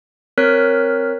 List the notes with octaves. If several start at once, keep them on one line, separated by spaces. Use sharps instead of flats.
C4 A#4 C#5 F6 F#6 B6